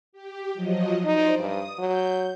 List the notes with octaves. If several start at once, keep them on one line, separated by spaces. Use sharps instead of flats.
G4
F3 F#3 D#5
D#4 C5 D5 D6
G2 D#6
F#3 G6